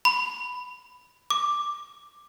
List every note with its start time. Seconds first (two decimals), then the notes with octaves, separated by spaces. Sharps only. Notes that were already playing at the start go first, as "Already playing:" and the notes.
0.05 B5
1.30 D6